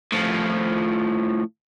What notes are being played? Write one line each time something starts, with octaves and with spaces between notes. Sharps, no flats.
A2 F3